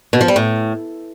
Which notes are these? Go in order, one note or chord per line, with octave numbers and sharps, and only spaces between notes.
B2
F3
G3
A2